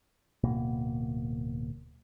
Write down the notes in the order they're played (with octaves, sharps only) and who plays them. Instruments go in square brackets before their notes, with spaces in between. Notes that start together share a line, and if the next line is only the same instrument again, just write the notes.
[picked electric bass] D1 B2 A#3